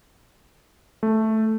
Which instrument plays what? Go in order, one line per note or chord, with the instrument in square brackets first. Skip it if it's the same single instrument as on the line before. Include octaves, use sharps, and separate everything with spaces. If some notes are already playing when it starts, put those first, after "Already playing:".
[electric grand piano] A3